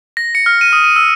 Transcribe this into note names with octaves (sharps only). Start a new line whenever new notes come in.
A#6
C#7
F6
D#7
D#6
D#7
E6